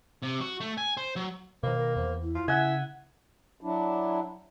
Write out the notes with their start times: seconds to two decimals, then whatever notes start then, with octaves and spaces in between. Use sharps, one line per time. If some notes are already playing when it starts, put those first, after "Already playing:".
0.22 C3
0.41 F#4
0.61 A3
0.78 G#5
0.97 C5
1.16 F#3
1.63 B2 D#3 A#3 C5
1.78 A#4
1.96 E2 C5
2.23 E4
2.35 F4
2.48 C#3 E5 F#5 G#5
3.61 F#3 D4 E4